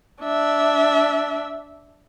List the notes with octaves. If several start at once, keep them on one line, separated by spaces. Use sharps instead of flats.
D4 E5